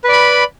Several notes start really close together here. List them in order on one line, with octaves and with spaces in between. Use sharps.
B4 D5 B5